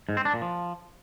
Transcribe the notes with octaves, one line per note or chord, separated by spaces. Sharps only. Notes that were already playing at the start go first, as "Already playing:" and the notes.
G#2
C4
D4
A#2
F3